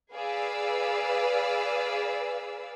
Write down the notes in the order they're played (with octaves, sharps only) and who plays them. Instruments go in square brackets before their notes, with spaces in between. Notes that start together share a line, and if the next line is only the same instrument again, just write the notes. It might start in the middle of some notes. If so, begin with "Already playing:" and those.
[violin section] G#4 B4 D5 F5 E6